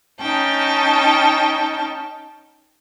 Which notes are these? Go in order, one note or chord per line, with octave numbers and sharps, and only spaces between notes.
C#4 D#4 G5 A5